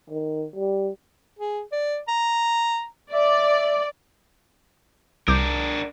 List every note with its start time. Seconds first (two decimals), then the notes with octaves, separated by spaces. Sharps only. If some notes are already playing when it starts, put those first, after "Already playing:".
0.10 D#3
0.56 G3
1.39 G#4
1.72 D5
2.08 A#5
3.13 D5 E5
5.28 C2 D4 A#4 D6 G6